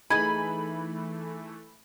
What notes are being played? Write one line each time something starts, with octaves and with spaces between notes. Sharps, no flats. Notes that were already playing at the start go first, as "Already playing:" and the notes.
E3 A3 D#4 G#4 G#5 B5